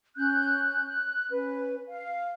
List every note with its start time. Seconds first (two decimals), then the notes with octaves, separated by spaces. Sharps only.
0.16 C#4 F#6 G6
0.85 F#6
1.29 C#4 B4
1.89 F5